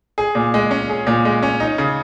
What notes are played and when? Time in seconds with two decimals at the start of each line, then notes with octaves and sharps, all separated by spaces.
0.18 G#4
0.35 A#2
0.54 G#3
0.71 C#4
0.90 G#4
1.07 A#2
1.25 G#3
1.42 C#4
1.60 D#4
1.78 C#3